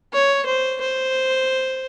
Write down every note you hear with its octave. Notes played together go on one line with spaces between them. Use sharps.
C#5
C5
C5